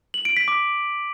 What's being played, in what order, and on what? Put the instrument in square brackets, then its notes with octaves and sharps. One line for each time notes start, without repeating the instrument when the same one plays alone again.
[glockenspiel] F#7
D7
B6
D6